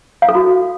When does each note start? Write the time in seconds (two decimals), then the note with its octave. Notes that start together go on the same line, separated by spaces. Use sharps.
0.22 F5
0.29 A4
0.35 F#4